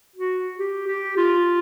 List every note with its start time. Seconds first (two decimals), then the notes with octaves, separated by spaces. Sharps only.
0.16 F#4
0.59 G4
0.87 G4
1.17 F4